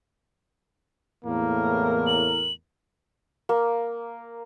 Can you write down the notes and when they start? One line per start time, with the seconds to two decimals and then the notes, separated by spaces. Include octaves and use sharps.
1.25 E2 A2 A#3 A#4
2.07 F#7
3.49 A#3